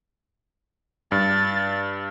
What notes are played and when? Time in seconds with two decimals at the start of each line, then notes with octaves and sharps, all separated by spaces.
1.12 G2 A6